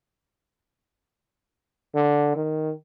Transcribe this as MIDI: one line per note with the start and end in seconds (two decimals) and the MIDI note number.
1.95 2.32 50
2.36 2.72 51